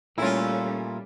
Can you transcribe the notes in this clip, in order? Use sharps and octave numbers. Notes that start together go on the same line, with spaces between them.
A#2 G3 A3 C#4 E4 F4